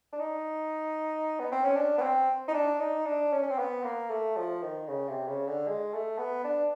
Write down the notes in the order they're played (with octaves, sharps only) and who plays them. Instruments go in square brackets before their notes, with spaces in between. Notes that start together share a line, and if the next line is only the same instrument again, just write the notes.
[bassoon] D4
D#4
B3
C4
C#4
D4
B3
C4
D#4
D4
D#4
D4
C#4
C#4
C4
B3
A#3
A3
F3
D#3
C#3
C3
C#3
D3
G#3
A3
B3
D4